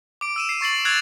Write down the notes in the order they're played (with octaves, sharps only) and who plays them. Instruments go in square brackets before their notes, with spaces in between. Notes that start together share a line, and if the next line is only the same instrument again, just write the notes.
[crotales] D6 D7
E6 D#7 E7
C7
C#6 A6 C7 F#7
E6 F#6 G#6 A6 C7 F7